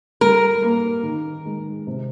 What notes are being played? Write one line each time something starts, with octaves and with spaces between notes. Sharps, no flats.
G3 A#4
A#3
D#3
G#3
C3